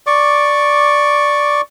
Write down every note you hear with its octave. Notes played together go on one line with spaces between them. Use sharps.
D5 C#6 D6